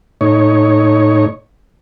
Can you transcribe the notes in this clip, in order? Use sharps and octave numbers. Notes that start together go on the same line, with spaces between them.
A2 D#4 C#5